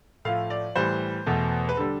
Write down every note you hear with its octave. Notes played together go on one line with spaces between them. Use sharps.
A2 F3 A3 F5
D5
A2 E3 G3 C5
E2 B2 A3
B4
D3 G3 A4